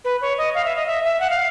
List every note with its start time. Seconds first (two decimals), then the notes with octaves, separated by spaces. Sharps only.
0.05 B4
0.21 C#5
0.38 D#5
0.55 F5
0.65 E5
0.76 D#5
0.86 E5
1.05 E5
1.20 F#5
1.30 F5